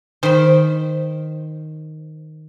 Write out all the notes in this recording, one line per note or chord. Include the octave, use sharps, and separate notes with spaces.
D#3 C5 B5